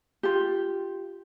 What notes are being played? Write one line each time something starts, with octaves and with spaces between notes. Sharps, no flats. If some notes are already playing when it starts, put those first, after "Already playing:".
F4 G4